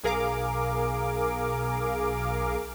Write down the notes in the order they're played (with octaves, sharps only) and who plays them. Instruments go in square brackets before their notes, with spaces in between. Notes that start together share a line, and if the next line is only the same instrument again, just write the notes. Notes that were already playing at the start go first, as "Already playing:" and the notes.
[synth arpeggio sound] B1 G#4 A#4 F5 D6